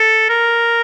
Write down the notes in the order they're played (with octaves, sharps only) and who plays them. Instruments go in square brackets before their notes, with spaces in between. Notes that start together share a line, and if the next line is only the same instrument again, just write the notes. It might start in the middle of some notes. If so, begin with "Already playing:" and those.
Already playing: [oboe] A4
A#4